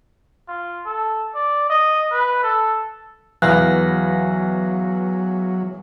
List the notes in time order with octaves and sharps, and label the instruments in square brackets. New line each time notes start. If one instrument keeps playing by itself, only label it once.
[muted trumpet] F4
A4
D5
D#5
B4
A4
[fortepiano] E2 [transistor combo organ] F#3 [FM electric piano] B3 F5 A#6 [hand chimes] F#6